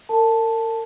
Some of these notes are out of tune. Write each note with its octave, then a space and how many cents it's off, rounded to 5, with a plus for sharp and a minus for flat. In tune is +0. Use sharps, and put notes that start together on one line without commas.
A#4 -40 A5 +0